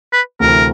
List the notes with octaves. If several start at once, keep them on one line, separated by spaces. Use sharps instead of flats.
B4
D2 C3 E3 A#4